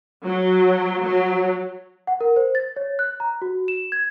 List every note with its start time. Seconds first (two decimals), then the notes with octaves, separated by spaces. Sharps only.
0.23 F#3
1.02 F#3
2.07 F#5
2.21 A#4
2.36 C5
2.55 A6
2.76 C#5
2.99 F#6
3.20 A#5
3.42 F#4
3.68 E7
3.92 G#6